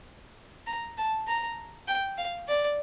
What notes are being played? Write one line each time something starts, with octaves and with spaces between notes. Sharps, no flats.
A#5
A5
A#5
G5
F5
D5